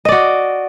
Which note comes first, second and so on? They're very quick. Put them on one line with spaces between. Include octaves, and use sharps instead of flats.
D#5 D5 F#4